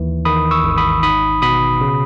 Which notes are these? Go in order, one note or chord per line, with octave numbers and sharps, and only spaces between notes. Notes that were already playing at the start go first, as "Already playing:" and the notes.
Already playing: D#2 E3
D#3 B5 D#6
C#6 E6
G#1
B5 D#6
D#4 B5 D#6
B2 B5 D#6
C#3